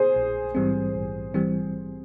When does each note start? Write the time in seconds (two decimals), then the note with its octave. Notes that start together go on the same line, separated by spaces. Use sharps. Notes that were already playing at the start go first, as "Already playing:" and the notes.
Already playing: G#4 C5
0.16 A#1
0.55 G#2 E3 G3 C4
0.94 A#1
1.34 E3 G3 C4